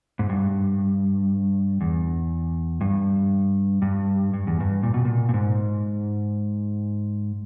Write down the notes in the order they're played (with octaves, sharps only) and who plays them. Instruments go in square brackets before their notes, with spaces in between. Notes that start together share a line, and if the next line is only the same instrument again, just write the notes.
[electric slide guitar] G#2
G2
E2
G2
G2
G2
E2
G2
A#2
B2
A#2
A#2
G#2